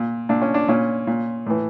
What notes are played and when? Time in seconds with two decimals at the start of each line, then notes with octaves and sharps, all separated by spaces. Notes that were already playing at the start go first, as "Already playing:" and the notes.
Already playing: A#2
0.29 A#2 D4
0.42 C#4
0.54 D4
0.68 A#2 C#4
1.07 A#2
1.46 A2 E3